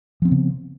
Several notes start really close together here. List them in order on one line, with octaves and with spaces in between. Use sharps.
F3 C4 B3 C#3